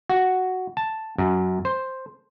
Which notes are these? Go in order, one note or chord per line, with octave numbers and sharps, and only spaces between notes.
F#4
A5
F#2
C5